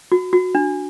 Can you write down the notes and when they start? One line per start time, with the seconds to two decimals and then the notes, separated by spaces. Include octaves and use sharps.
0.12 F#4
0.33 F#4
0.55 D4